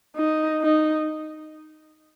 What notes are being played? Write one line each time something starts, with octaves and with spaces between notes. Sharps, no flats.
D#4
D#4